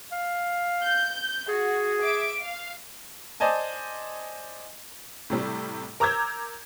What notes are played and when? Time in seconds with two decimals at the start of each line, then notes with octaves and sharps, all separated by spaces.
0.12 F5
0.81 G6
1.48 F#4 G#4
2.01 E5 D6 D7
2.41 F5
3.40 C5 D5 D#5 G#5 A5
5.30 A2 C3 G3
6.00 A#4 A#5 D6 E6 G6 G#6